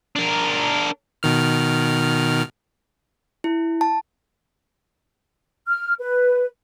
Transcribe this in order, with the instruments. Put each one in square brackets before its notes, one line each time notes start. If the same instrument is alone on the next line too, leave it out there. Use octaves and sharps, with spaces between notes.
[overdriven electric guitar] D4 A#4
[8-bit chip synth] B2 D#3 F6
[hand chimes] E4
A5
[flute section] F6
B4